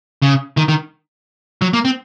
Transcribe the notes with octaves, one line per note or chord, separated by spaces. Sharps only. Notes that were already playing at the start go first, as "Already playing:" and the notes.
C#3
D#3
D#3
F#3
A#3
C4